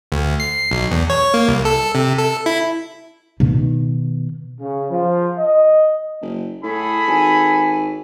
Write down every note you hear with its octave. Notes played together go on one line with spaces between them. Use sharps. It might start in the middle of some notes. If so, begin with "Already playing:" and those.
D2
C7
B1
E2
C#5
A#3
C2
A4
C3
A4
E4
B2 D#3
C#3
F3
D#5
F#1
A2 G#4 A4 B5
G#1 G#5